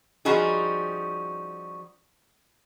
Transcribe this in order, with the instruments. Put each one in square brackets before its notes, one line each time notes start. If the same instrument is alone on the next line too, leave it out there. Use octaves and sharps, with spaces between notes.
[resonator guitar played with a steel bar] F3 G3 C#4 D#4 F#4 G#4